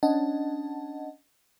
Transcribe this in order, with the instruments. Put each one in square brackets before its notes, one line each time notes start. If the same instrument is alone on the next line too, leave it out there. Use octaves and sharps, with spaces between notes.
[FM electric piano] C#4 D4 D#5 F#5 A5